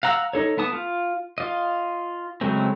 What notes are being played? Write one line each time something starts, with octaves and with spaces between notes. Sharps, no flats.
F5 F#5 A#5 E6
D#4 A4 C#5
A3 B3 A5 D#6
F4
F4 D#5
C#3 F#3 G#3 A3 C4